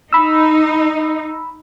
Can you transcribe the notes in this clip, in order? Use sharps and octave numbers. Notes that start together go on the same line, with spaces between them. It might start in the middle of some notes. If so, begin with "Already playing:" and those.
D#4 B5 E6